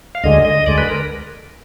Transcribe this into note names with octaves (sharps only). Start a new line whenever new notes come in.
F5
D2 D3 G#3 D#5
D#5
D2 D3 G#3 D5
B4
A#4